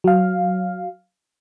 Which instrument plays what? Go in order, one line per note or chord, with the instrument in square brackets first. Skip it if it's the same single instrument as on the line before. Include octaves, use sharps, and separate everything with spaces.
[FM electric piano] F#3 F5